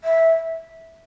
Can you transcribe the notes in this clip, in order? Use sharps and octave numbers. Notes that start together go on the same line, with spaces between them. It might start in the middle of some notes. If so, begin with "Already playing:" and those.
E5